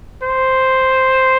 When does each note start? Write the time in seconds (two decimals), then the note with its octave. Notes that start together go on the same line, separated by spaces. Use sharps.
0.23 C5